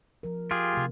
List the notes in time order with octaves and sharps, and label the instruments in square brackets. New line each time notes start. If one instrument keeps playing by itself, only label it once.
[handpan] F3 A#4
[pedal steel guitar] F4 G4 G#4
[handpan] C3 A3